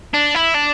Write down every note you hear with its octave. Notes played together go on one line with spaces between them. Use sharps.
D4
E4
D4